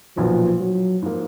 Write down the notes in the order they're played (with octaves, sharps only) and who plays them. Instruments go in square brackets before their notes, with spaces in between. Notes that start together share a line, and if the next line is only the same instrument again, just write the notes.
[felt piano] B1 A#2 F#3 B3 [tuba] F3
[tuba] F#3
[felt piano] G#2 F3 A#3